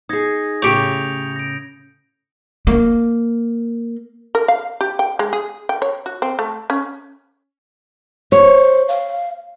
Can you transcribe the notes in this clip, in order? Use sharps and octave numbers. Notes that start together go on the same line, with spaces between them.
D#4 G#4 D#6 G#6 A#6
A2 C#3 G4 C#5 G6 C#7 F7
F7
A#6 D7
A#3
A#4
F5
G4
G5
G#3
G#4
G5
C#5
F#4
C4
A3
C#4
C5 C#5
F5